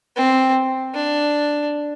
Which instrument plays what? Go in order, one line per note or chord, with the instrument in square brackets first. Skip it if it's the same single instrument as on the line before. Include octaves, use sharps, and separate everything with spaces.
[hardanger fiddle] C4
D4